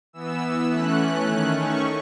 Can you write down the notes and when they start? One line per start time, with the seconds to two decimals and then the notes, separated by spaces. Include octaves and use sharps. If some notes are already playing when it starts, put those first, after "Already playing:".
0.13 E3 B3 E6
0.70 E3 A3 C#4 F#6
1.28 D#3 A3 C#4
1.57 C#6